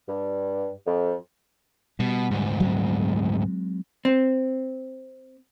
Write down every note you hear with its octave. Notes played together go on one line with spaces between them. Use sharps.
G2
F2
B2 G3
D2 G#2
F#3 G#3 C4
C4